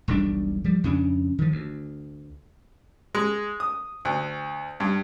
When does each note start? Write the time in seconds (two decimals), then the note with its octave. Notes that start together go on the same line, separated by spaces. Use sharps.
0.08 E1 B1 G3 D4
0.64 F3 G3
0.84 F2 C#3 C#4 D4
1.38 D#3 F3
1.52 D2
3.15 G#3
3.60 D#6
4.05 D2
4.80 G2